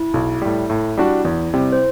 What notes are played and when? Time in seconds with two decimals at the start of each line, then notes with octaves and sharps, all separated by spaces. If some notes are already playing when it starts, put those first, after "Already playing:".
Already playing: E4
0.14 B1
0.42 A2 G3
0.70 A2
0.97 G3 D4 F#4
1.25 E2
1.54 C3 G3
1.72 C5